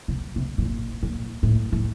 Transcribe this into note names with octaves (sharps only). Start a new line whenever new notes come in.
C3
C3
B2
A#2
A#2
A2
A2